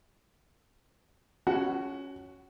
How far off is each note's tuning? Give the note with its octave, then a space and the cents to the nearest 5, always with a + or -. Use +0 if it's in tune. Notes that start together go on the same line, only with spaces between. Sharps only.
C#4 +0 F#4 +0 F#5 +25